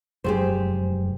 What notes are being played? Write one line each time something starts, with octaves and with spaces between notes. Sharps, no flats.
F1 F#2 G#3 G4 G#4 C5